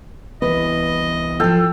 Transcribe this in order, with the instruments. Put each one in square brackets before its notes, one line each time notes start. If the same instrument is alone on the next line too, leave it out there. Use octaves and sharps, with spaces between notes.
[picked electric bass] C2 E3 B3 [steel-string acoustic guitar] B4 [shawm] D#5
[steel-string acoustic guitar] F3 F4 [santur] A4 G5